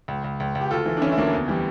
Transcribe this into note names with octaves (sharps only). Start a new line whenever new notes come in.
C#2
C#2
C#2
C#2
G4
D2 F4 A4
E3
D4
E3 C#4 E4
E4
D2 A#3 D4
E2
E3 G3